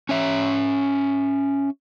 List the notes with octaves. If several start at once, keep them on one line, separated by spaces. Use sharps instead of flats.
C#4 C#5 E5